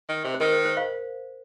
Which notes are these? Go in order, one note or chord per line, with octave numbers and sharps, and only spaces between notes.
D#3
C3
C5
D#3 A#4
C5
C5
C5 F5